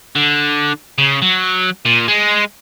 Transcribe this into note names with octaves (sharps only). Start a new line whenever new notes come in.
D3
C#3
F#3
A#2
G#3